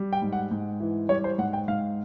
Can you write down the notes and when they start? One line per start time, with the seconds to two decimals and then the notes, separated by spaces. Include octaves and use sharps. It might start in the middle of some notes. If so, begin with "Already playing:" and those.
Already playing: G3
0.13 G5
0.22 G#2
0.33 F#5
0.51 G#2
0.80 E3
1.09 G3 C#5
1.24 C5
1.38 G#2 F#5
1.53 G5
1.68 G#2 F5